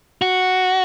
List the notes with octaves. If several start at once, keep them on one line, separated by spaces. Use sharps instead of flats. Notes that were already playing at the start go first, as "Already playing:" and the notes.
F#4